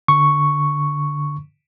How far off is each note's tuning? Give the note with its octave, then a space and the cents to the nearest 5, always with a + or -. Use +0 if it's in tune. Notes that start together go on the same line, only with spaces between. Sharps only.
D3 +0 C#6 +0